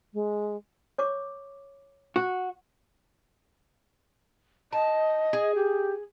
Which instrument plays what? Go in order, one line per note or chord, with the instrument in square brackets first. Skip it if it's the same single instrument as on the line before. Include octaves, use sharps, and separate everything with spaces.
[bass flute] G#3
[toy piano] C#5 C#6 D6
[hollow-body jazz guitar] F#4
[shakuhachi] D#5 [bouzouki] A5
[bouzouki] G#4
[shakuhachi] G4